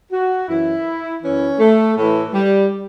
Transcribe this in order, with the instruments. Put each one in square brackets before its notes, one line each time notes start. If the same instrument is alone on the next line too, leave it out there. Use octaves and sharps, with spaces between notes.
[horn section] F#4
F#2 E3 E4
F#2 E3 C#4
A3
A2 E3 A3
G3